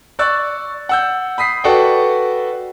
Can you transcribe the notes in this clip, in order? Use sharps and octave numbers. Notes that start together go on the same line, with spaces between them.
D5 C#6 E6 F#6 A6
F#5 E6 G6
B5 D#6 B6 C7
F#4 A4 B4 D5 F#5 G5